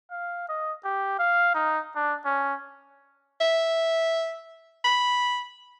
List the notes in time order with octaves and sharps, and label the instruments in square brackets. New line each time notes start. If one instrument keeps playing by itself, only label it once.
[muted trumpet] F5
D#5
G4
F5
D#4
D4
C#4
[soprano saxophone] E5
B5